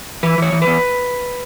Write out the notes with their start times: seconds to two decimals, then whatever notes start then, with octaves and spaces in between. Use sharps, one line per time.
0.23 E3 B4
0.38 E3 C#5
0.52 E3
0.62 B4
0.67 E2